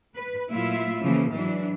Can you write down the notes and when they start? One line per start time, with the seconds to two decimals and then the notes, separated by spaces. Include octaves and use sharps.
0.14 B4
0.50 A#2 F#3 A3 E4 F4 E5
1.02 C#3 E3 F3 A#3
1.32 G#2 E3 F#3 D4